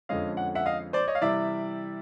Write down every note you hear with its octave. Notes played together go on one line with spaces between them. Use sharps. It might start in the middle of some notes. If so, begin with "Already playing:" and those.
F2 D3 F3 G#3 C#4 D#5 F5
F#5
E5 F#5
D#5 F5
C5 D5
C#5 D#5
F5
C3 E3 G3 D5 E5